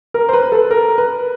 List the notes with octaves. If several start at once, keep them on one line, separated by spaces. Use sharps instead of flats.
A#4
C5
B4
A4
A#4
B4